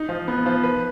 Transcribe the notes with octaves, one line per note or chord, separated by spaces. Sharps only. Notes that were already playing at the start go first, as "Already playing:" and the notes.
Already playing: D#4
F3
B3
F3
B4